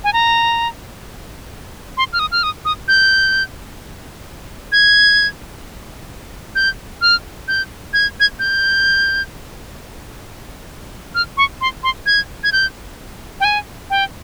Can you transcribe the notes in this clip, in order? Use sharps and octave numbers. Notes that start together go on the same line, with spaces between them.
G#5
A#5
C6
F6
D#6
F6
D#6
D#6
G6
G#6
G6
F6
G6
G#6
G#6
G6
F6
C#6
C6
C6
G#6
G#6
G6
G5
G#5
G5